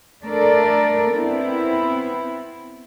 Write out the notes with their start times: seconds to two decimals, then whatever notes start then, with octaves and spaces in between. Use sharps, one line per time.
0.24 A3 D4 A4 A#4 D5
1.14 B3 C4 E4